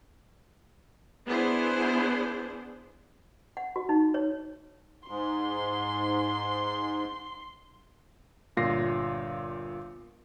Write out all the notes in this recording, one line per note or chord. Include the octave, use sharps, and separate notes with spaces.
B3 D4 E4 G#4 C5
F#5
F#4
D#4
C#5
G#2 C6
G1 A#2 F4 A#6 C7